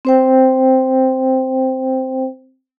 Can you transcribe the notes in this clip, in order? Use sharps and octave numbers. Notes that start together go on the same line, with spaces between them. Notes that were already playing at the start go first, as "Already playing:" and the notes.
C4 C5 G5